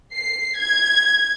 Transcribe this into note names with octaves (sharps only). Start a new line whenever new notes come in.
C7
G#6